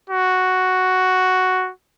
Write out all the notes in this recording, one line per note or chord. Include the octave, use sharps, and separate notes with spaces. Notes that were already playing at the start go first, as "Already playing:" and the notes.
F#4